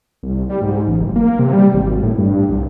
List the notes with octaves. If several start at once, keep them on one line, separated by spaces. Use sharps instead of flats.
C2
G3
G#2
A1
F#1
A#3
C3
G3
G#1
A2
G2
C2